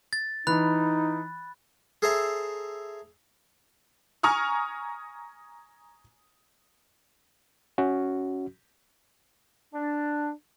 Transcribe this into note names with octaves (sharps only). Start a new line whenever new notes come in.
A6
E3 D#4 B5 F#6
G#4 A4 C5 E5 G#5 A#5
G#5 A#5 C#6 D#6 F6
C#4 F#4
D4